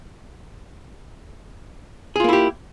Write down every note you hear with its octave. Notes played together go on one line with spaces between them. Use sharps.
A#3 E4 F4 G4 G#4